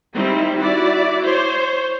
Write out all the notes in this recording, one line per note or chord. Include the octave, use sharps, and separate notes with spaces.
D#3 G3 C4 D#4 E4
E4 F#4 D5
C5 C#5